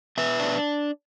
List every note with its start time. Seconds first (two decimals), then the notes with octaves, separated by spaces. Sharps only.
0.17 B2 B4 E5
0.39 D4